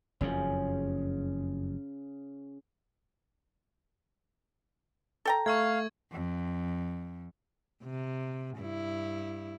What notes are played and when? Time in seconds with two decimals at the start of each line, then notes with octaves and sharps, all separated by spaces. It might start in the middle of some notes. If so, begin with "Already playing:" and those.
0.21 F#1 F2 C#3 F3
5.25 A4 G5 A#5
5.46 A3 F5 C#6 E6 G#6
6.12 F2
7.83 C3
8.57 G2 E4